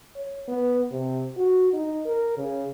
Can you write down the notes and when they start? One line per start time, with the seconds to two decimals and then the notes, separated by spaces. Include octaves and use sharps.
0.16 C#5
0.48 B3
0.92 C3
1.37 F#4
1.73 D#4
2.06 A#4
2.38 C#3